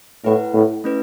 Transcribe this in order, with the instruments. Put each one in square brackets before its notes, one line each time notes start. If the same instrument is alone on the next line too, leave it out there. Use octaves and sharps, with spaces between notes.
[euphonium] A2 [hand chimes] E4 B4 F#5
[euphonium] A2
[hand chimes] A3 C#4 E4 B4